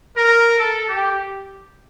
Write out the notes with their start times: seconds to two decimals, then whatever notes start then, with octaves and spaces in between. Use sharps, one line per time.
0.17 A#4
0.58 A4
0.88 G4